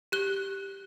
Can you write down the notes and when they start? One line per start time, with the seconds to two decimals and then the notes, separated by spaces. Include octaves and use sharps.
0.12 G4 F#6 G7